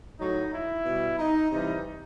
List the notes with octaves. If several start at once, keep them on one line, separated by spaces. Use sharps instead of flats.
A2 F#3 D#4
E4
B2 G3
D#4
C3 E3 G3 D#4